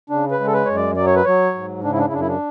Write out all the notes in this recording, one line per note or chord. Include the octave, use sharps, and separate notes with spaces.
C#3 D4
B4
G#3
A4
B4
F#2 C#5
D5
F#3 D5
C#5
B4
F#3 C#5
G#2
C#3 D4
E4
D4
E4
F#2 D4
E4
D4